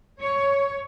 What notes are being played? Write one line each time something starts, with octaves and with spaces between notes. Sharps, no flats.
C#5